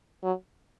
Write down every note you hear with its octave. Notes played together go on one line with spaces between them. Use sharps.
F#3